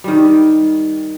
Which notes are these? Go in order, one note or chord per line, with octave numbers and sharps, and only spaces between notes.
D#3 G3